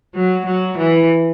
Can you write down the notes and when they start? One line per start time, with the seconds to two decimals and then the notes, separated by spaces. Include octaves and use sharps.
0.15 F#3
0.46 F#3
0.78 E3